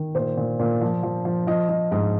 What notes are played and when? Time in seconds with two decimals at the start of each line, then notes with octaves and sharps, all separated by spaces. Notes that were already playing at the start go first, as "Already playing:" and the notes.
Already playing: D#3
0.15 A#2 C5
0.37 A#2
0.59 A#2
0.81 F3
1.03 F3
1.25 F3
1.47 F3 D#5
1.69 F3 D#5
1.91 G#2 D#5